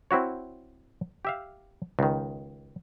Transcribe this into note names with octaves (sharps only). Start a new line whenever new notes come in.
C4 E4 F#4 C#5
G4 E5 F5
C#2 D#3